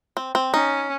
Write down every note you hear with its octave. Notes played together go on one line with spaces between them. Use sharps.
C4
C4
C#4 D#4